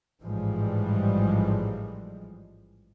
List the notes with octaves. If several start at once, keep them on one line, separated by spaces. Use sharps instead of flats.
A1 G#2 E3 F3 G3 G#3